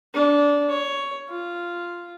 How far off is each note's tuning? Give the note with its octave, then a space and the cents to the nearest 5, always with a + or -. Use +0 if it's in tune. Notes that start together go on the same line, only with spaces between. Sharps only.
D4 -20
C#5 +10
F4 -5